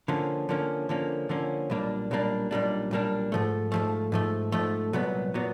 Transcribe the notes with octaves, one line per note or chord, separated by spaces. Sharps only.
D3 F3 A#3 C#4
D3 F3 A#3 C#4
D3 F3 A#3 C#4
D3 F3 A#3 C#4
B1 A#2 G3 A#3 D4
B1 A#2 G3 A#3 D4
B1 A#2 G3 A#3 D4
B1 A#2 G3 A#3 D4
G#2 F3 A3
G#2 F3 A3
G#2 F3 A3
G#2 F3 A3
C2 A#2 F#3 B3
A#2 F#3 B3